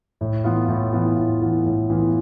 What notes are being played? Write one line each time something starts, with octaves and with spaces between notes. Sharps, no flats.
A2
E3 B3 F4
A2
E3 B3 F4
A2
E3 B3 F4
A2
E3 B3 F4